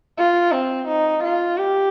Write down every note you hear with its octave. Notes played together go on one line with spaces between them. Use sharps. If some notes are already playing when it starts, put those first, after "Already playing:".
F4
C4
D#4
F4
G4